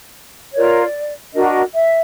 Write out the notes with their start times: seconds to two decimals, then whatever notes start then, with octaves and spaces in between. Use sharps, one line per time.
0.54 F4 A#4 C#5 D5
1.33 D4 F#4 A#4 D#5
1.73 E5